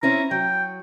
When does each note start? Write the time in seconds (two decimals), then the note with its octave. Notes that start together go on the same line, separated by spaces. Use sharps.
0.03 C4 C#4 E4 A#5
0.31 F#3 G5